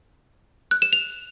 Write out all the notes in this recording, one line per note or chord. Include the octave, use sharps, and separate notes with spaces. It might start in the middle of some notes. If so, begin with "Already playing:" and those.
F#6
E7
F7